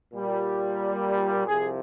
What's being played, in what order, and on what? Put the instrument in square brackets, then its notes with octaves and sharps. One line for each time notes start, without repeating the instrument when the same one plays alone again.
[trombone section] A#2 G3
C2 C3 F3 G#4